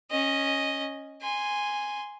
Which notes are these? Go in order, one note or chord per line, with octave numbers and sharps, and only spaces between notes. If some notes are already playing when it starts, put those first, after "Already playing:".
C#4 D#5
G#5 C6